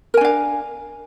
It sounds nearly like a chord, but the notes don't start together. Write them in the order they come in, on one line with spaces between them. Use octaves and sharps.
A#4 G#5 D4 F5